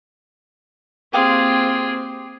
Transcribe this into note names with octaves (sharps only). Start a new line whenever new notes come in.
A#3 C4 F4 G4 G#4 F5 D#6